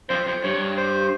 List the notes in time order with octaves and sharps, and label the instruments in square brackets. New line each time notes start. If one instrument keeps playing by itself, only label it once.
[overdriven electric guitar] F2 [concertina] C5
[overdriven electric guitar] F2 [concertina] C5
[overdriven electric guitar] G2 [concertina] C#5
[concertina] C5